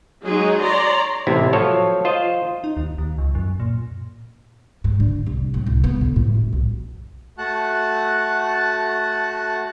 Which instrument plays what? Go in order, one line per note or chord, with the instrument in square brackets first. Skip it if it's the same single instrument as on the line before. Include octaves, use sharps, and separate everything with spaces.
[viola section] F#3 G#3 D#4 G#4
C#5 D5 A#5 C6
[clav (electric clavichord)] A1 C3 E4
F3 F#3 A4 C#5
F4 C5 D#5
[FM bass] D#4
D#2
D#2
C#2
F#2
A#2
[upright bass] G#2
D3
C2
A2
C2
B3
D3
A2
F#2
B1
[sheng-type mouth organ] A3 F#4 F#5 A5 F#6